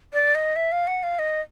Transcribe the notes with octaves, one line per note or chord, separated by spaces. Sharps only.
D5
D#5
E5
F5
F#5
F5
D#5